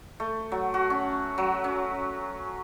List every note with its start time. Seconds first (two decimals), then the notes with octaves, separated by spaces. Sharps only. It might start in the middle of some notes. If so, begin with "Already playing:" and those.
0.20 A3
0.52 F#3
0.74 F#4
0.90 C#4
1.38 F#3
1.64 C#4